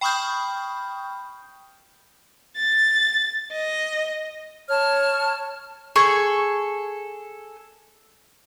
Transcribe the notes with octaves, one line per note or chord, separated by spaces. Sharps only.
G5 B5 C#6 D#6 F6 G6
A6
D#5
C#5 A5 F6
G#4 A4 C#6